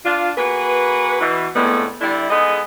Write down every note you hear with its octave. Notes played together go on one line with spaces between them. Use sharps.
D4 F4
A#3 F#4 G#4 B4
B2 E3
F2 A2 D3 G#3 A3 B3
D3 G3 D4 E4
G#3 B3 D#4 G#4 A4 D#5